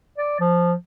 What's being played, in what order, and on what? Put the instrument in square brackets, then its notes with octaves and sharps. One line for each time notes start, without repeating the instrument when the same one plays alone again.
[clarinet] D5
F3